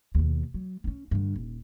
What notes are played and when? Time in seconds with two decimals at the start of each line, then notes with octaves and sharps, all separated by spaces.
0.15 D#2 B2
0.54 F#3
0.84 C4 C#4
1.11 G2 D3
1.36 D#1